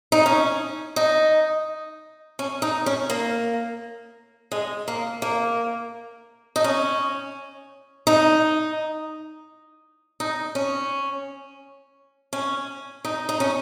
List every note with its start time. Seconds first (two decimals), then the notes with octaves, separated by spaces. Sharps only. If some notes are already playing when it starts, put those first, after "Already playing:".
0.12 D#4
0.26 C#4
0.96 D#4
2.39 C#4
2.62 D#4
2.86 C#4
3.10 A#3
4.52 G#3
4.88 A#3
5.22 A#3
6.56 D#4
6.64 C#4
8.07 D#4
10.20 D#4
10.55 C#4
12.33 C#4
13.05 D#4
13.29 D#4
13.40 C#4